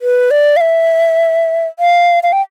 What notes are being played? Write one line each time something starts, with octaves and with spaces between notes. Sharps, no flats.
B4
D5
F5
E5
F5
F5
G5